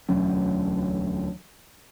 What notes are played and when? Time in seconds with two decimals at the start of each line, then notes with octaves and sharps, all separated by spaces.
0.09 E1 D2 F#3 C#4